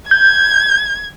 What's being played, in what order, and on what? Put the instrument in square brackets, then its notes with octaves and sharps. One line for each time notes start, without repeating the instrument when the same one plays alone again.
[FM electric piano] G6 [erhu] G#6